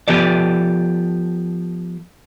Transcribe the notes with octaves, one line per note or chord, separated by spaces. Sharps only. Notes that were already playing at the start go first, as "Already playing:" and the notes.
F3 B3 G4 A4 D5